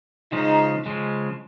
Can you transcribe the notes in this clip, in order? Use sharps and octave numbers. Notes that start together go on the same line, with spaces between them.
C#3 F3 G#3 D#4
C#3 F3 G#3